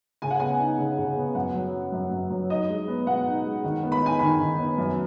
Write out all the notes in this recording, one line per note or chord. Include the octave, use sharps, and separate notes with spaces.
C#3 G#5
F#5
B3 G#5
D#4
C#3
C#3
B3
F#2 F#5
F#3
C#4
F#2
F#2
F#3
D#4 D#5
G#3
B3
B2 F#5
D#4
G#3
D#3
B3
B5
D#4 G#5
D#3 B5
D#3
B3
F#2